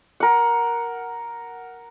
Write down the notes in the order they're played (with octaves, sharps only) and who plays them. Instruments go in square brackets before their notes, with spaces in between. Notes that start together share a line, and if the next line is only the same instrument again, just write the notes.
[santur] A#4 F#5